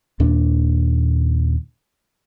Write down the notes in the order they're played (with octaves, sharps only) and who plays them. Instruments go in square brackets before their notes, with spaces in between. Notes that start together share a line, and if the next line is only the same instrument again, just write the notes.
[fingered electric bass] D#2 A#2 D4